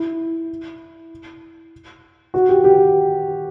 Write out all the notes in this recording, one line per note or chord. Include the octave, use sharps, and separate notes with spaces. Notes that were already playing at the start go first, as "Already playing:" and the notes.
Already playing: E4
F#4
G4
G4